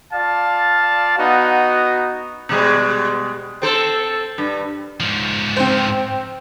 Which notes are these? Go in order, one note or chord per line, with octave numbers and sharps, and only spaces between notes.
F4 D5 F5 A5
B3 D#4 F#4
B2 G3 G#3
C4 A4 C5
G2
G#2 F3
C4 C5